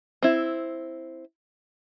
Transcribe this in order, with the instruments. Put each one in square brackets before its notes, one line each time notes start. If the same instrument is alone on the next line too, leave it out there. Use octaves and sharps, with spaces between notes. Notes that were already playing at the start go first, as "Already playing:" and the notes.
[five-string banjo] C4 E4